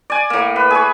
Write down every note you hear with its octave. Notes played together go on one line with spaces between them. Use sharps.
D5 G#5
A2 A#3
B4
G#4 C#5